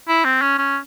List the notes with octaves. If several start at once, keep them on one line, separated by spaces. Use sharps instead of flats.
E4
C4
C#4
C#4